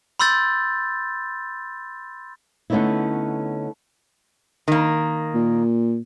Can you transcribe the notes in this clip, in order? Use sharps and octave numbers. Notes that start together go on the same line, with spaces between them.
B5 C6 E6 G6 A6
D3 A3 B3 C#4 D#4 E4
D#3 A#3
A#2